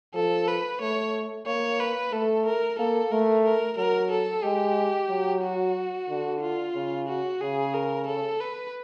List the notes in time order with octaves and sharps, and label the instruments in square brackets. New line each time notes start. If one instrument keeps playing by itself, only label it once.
[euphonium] F3 [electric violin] A4
[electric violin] B4
[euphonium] A3 [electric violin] C#5
[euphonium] A#3 [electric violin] C#5
[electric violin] B4
[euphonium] A3 [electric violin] A4
[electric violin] A#4
[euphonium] A#3 [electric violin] A4
[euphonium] A3 [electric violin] A#4
[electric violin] A#4
[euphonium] F#3 [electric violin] A#4
[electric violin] A4
[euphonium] G#3 [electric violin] G4
[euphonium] F#3
[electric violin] F#4
[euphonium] D3
[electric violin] F4
[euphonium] C#3
[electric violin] F#4
[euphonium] C#3 [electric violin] G#4
[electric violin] A#4
A4
B4